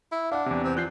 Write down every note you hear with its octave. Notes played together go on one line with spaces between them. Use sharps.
E4
D4 F5 F#5
E2 C3
C4
F3 F#6 G6 C7